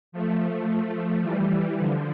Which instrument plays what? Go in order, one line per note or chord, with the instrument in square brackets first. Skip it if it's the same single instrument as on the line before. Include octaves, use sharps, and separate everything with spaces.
[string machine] F3 A3
E3 G3
D3 F3